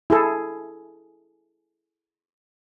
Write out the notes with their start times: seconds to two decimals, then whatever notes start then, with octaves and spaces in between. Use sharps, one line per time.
0.10 E4 G#4 A4